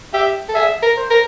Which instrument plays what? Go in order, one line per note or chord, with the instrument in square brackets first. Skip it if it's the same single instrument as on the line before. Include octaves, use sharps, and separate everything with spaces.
[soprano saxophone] G4 [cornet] E5
[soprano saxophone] A4
[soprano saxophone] G#4 [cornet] E5
[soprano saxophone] A#4
[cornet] C5
[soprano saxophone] A#4